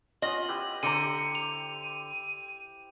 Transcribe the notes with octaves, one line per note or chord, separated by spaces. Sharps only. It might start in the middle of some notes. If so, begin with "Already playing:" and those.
B3 C#4 F4 D#5 F#7
E4 G4 B4
D3 G4 C5 A#5 C#7 D#7
F7
D#7